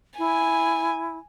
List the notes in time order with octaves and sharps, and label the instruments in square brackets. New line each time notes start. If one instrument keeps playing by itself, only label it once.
[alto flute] E4 [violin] G#5